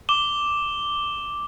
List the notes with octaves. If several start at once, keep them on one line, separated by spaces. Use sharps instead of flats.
D6 E7 G7